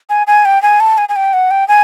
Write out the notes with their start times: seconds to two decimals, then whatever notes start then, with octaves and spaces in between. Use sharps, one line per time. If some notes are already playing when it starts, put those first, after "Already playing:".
0.10 G#5
0.27 G#5
0.45 G5
0.62 G#5
0.80 A5
0.98 G#5
1.09 G#5
1.16 G5
1.33 F#5
1.51 G5
1.68 G#5